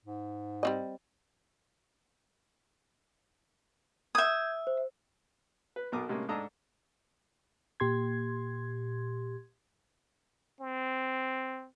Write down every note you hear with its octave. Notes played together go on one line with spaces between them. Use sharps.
G#2
G3 C4 D#5
E5 D#6 G6 G#6
C5
B4
B1 B2 A#4 D6 D#6
A2 C3 G#3 A#3 C#4
G#2 G#3 D4 A4 D#5 A#5
A#2 G4 C6 G#6
C4